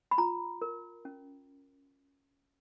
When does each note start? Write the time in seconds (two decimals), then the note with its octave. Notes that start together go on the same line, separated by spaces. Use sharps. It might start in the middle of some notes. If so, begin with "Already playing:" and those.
0.11 B5
0.18 F4 A#5
0.62 A#4
1.05 C#4